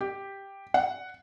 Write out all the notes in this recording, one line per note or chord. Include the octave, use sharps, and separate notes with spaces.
G4
F#5